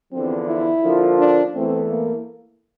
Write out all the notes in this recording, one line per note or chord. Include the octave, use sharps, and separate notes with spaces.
E2 D3 F3 C4
E4
D3 F3 A#3 F4
D4
E2 E3 A3 C4
A#3